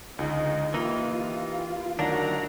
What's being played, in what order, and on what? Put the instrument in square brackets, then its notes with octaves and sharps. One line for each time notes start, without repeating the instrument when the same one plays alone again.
[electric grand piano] C#2 D#4 [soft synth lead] D3 [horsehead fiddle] D#5
[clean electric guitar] E3 D#4 [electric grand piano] A#3 [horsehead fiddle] F4 [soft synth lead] G4
[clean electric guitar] D2 F#3 D4 [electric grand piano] D#3 [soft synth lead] A#4 [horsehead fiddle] F#5 A#5